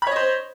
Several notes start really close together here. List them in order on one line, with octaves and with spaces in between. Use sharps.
B5 C#5 D#5 C5